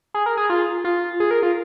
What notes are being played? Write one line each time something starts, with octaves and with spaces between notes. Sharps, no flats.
G#4
A#4
G#4
F4
F4
G#4
A#4
F4